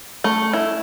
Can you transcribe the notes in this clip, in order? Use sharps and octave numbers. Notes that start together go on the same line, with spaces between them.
A3
E4